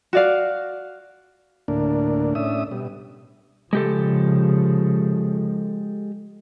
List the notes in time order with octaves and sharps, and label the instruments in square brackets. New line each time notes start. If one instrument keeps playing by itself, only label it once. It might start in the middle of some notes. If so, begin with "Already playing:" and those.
[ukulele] F#4 D5 F5
[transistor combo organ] D2 A2 A#3 D4
A2 C#4 D4 E5 D#6
B2 G3
[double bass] C#3 F3 [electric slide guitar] G#3 G4 A4